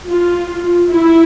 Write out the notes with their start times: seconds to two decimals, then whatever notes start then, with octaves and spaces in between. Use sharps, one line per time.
0.10 F4
0.91 E4